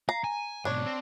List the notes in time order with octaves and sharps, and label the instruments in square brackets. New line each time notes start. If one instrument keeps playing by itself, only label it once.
[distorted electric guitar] F5 [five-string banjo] A#5
[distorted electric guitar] G#5
[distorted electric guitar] G#2 B2 [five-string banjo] D4 C#5
[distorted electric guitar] C4